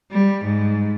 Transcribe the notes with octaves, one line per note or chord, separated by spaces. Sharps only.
G3
G#2